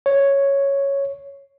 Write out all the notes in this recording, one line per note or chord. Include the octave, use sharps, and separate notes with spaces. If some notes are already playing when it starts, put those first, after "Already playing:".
C#5